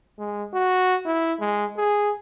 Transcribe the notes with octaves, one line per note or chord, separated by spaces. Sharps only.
G#3
F#4
E4
G#3
G#4